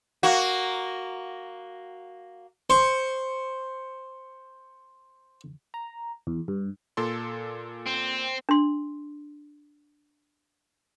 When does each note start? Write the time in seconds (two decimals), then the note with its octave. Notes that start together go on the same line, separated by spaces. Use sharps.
0.23 A#3 F#4
2.70 C5 C#6
5.74 A#5
6.27 E2
6.48 G2
6.97 A#2 A4 C6
7.87 C4
8.49 D4 C6